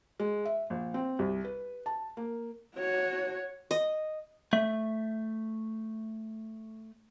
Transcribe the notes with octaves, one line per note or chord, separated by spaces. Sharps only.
G#3
E5
A#1
C4
C2
B4
A5
A#3
F#4 C#5
D#5
A3 E5